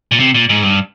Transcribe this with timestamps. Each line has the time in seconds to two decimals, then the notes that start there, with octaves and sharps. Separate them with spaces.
0.12 A#2
0.20 C3
0.34 A#2
0.49 G#2
0.63 G2